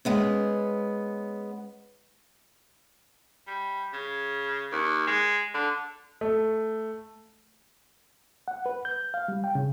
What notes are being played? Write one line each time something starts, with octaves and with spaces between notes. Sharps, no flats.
G#3 B3 C#4
G3
C#3
D#2
G#3
D3
A3
F#5
B4
G6
F5
G3
G5
C#3